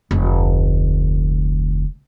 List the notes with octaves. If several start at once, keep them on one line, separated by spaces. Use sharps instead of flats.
F1 D2